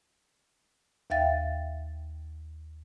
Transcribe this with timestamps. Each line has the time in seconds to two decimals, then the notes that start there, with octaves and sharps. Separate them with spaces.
1.10 D#2 E5 F5 G5 A6